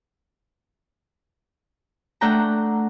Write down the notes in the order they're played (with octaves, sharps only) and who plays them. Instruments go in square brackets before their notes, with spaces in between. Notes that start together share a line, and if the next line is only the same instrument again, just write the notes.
[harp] A3 D4 F#5 G5 A#5